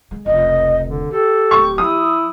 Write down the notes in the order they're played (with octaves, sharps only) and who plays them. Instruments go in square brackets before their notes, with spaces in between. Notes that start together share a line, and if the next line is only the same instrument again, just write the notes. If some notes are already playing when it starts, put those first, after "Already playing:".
[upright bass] D3 G#3
[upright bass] F1 C#2 [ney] D#5
[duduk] D3
[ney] G4 [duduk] A4
[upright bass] D1 A3 [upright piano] C#6
[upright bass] F3 [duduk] E4 [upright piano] D#6